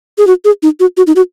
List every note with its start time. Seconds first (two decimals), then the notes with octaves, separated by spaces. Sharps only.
0.18 G#4
0.27 F#4
0.45 G#4
0.63 D#4
0.80 F#4
0.97 F#4
1.07 D#4
1.16 F#4